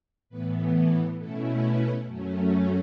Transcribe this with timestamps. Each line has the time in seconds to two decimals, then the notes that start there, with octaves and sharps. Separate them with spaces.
0.29 A2 E3 B3 B4
0.74 A4
1.17 B2 A3 C#4 E4 A4
1.61 B4
2.06 F#2 F#3 A3 C#4
2.50 A4